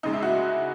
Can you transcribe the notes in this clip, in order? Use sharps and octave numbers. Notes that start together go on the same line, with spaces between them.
E2 C#3 G#3 D#4
E4
F#4